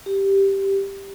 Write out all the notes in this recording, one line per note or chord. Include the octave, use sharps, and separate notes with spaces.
G4